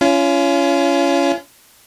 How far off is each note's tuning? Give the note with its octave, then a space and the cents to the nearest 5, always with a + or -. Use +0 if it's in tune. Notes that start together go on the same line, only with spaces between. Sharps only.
C#4 +20 F4 -35